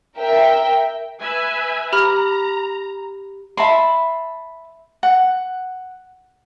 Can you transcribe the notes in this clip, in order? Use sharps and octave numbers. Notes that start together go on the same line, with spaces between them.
A#4 E5 G5
B4 E5 G#5
G4 A#5 B5 F6
E5 A5 B5 C6
F#5